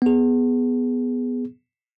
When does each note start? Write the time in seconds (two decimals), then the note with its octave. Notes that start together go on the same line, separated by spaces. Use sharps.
0.02 B3 G#4